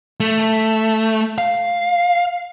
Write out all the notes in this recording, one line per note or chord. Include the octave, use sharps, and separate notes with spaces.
A3
F5